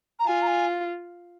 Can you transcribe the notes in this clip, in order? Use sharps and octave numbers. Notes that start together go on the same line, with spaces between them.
A#5
F4 G#5
A#5
G#5